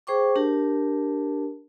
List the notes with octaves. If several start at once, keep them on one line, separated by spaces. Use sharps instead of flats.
G#4 C5 G5 C#6 D6
D4 G4 A#4 A5